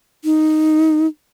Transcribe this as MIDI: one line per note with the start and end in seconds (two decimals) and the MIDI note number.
0.24 1.07 63